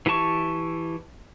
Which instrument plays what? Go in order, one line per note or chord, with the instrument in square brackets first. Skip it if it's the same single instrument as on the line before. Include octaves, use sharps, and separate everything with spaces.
[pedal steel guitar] E3 E4 G4 A5 C#6